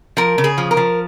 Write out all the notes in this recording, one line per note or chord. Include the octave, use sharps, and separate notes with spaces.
F3 A#4
C#3
G#4
F3
A#4
F3